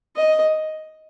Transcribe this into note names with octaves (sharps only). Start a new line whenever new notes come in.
D#5